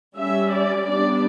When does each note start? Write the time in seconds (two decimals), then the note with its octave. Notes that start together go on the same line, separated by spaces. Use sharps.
0.17 G3 C#4 E5
0.52 D5
0.86 G3 B3 D4 D5